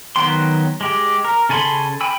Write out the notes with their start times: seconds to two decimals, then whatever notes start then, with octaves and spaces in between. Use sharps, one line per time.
0.16 D#3 F#3 B3 G5 C6
0.81 G#3 G4
1.25 A#4
1.49 C#3 A4 G#5 B5 C6
2.01 G5 G#5 B5 E6